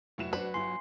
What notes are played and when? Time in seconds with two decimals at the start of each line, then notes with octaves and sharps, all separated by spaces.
0.18 F1 F#3 E4 E7
0.33 D4 F#4 B4 C5
0.54 G1 E4 G#5 C6 C7